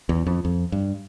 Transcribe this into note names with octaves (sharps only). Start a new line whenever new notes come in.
E2
F2
F2
G2